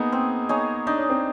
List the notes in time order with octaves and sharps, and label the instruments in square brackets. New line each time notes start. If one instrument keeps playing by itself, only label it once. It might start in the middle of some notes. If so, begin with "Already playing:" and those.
Already playing: [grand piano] A#3 B3 [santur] D#4 G#4
[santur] C4
D#4 G#4 C#5
[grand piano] D4 [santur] D#4
[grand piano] C#4
C4